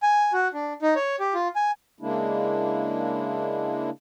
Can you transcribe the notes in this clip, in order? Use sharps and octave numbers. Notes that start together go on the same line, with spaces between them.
G#5
F#4
D4
D#4
C#5
G4
F4
G#5
C#3 G#3 A#3 D4 E4